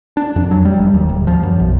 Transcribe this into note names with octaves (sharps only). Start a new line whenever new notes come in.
D4
F2
F#3
G3
F1
D#2
D1
F3
F#2
B1